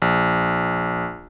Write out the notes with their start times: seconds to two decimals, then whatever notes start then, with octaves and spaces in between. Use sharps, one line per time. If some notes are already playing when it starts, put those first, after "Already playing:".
0.02 A#1